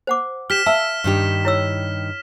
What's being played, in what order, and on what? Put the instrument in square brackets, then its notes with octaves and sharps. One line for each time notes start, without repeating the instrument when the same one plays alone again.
[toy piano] C5 F#5 D6
[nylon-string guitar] G4 [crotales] F6 B6 E7
[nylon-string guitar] E5 [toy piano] F5 A5 E6
[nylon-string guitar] G2 D#3 G4
[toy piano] E4 C#5 E6